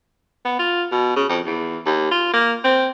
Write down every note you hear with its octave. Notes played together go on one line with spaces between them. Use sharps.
B3
F4
B2
C#3
F2
E2
D#2
F4
A#3
C4